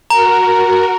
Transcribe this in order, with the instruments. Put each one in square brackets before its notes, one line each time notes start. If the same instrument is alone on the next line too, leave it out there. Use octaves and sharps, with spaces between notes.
[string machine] F#4 A#4 [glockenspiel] A#5